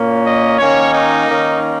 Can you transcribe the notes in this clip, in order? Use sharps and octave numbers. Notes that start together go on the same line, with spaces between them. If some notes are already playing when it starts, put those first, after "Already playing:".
Already playing: A#2 A#3 C#4
D#5
D#3 A#3 C#4 C#5
D#4
D#3 A#3 C#4